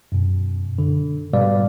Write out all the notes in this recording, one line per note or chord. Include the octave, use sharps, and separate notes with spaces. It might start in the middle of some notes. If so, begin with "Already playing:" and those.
F#2 B2
D3
G#2 B2 G3 B4 D5 F5